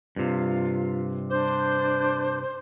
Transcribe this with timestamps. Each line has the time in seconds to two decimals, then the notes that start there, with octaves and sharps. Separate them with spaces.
0.16 G2 C3 F4
1.30 D4 C5 D6 G6